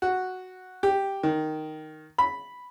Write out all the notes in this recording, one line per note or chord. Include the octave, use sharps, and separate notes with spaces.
F#4
G4
D#3
B5